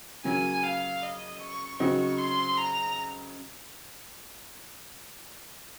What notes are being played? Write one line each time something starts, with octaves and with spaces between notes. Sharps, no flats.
C#3 F#3 A#3 C#4 G#5
F5
D#5
C#6
C#3 F#3 C4 D#4 F#4 C#6
C6
A#5